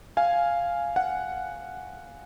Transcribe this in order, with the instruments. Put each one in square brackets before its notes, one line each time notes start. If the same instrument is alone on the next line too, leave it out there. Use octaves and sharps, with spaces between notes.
[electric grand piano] F5 G#5
F#5